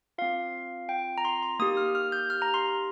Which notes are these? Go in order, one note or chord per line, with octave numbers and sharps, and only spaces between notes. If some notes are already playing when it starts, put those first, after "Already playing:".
C4 F4 F5
G5
A#5
C6
C6
A#3 D#4 G4 D#6
F6
F6
G6
F6
A#5
C6